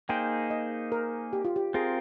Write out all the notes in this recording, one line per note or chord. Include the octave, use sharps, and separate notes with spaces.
A#3 D#4 G#4 C5 G5
D#5
A#4
G4
F4
G4
C4 F4 G#4 A#4